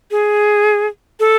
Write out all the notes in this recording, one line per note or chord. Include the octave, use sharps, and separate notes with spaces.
G#4
A4